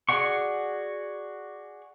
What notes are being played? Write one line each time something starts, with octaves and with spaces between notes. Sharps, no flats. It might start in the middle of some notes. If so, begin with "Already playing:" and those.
F#4 G#4 D5 F#5 C#6